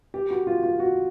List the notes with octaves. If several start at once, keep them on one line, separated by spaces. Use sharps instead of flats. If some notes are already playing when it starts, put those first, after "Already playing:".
G4
F#4
F4
F4
F#4